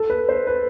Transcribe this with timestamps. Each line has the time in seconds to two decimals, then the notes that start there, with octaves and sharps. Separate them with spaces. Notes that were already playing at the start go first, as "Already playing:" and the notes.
Already playing: A4
0.10 B4
0.29 C5
0.47 B4